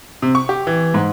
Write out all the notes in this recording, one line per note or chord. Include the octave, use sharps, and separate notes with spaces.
C3
C#6
G4
E3
G#2